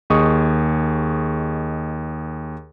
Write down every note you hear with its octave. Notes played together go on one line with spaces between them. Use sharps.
D#2 G#4 D#5 C#6 D#6